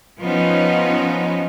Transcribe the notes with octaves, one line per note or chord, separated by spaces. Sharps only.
F3 B3 C#4 D#4